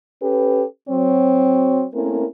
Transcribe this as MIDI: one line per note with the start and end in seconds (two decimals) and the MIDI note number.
0.22 0.65 61
0.22 0.65 67
0.22 0.65 69
0.22 0.65 71
0.89 1.85 54
0.89 1.85 60
0.89 1.85 73
1.94 2.25 57
1.94 2.25 58
1.94 2.25 60
1.94 2.25 61
1.94 2.25 64
1.94 2.25 70